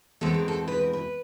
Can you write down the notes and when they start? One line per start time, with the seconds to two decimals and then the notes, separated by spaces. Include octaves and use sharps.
0.21 E2 B2 G#3 C4 A4
0.34 A#4
0.48 A4
0.68 B4
0.81 A#4
0.93 B4